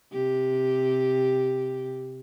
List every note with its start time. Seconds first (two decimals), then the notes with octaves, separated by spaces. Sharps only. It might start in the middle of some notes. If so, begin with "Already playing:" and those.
0.12 C3 G4